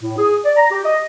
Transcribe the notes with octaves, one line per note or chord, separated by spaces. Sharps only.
A2
G#4
D5
A#5
G4
D#5